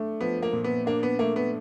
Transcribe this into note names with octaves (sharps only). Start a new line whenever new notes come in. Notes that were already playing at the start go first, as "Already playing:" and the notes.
Already playing: A3 D4
F3 B3
A#3
A#2
B3
A#3 D4
B3
A3 A#3
B3